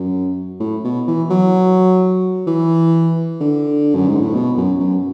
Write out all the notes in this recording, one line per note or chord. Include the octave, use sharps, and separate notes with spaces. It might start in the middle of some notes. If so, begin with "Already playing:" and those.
Already playing: F#2
A2
B2
E3
F#3
E3
D3
F#2
G#2
A2
B2
F#2
F#2